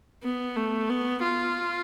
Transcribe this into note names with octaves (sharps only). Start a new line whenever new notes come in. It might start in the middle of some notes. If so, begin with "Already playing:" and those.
B3
A3
B3
F4